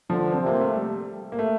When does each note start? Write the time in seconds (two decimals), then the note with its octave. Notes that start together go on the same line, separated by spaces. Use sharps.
0.10 D3 F3
0.32 C4
0.42 C3 A#3
0.60 A3
0.74 G3
1.32 A#3
1.39 A3